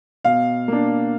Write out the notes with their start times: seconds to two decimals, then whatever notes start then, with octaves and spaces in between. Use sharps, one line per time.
0.25 B2 F5
0.68 A#3 D4